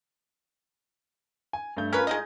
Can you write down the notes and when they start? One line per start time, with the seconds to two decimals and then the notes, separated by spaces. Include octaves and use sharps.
1.53 G#5
1.77 G2 A3 G6
1.93 C#4 F4 A#4 B4 F6
2.07 G#3 D#4 D#5